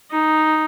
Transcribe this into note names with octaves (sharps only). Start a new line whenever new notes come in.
D#4